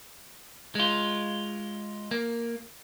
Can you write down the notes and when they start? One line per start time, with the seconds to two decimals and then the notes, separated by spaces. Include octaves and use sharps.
0.75 G#3 F4
2.11 A#3